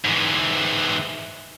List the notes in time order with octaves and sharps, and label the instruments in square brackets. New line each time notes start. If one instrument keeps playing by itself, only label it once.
[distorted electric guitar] G#2 E3